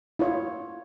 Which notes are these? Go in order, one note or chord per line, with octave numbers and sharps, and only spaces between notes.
E4 F4 C#5